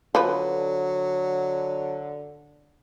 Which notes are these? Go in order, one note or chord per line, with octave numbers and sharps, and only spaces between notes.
D3 F3 F#3 B4